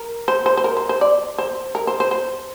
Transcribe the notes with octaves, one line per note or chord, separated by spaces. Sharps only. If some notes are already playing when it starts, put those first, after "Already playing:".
Already playing: A#4
C5
C5
C5
A#4
C5
C5
D5
C5
A#4
C5
C5
C5